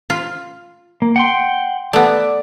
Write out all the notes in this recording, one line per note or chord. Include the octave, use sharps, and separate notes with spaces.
F4
A#3
F#5 G5 C6
A3 B3 D5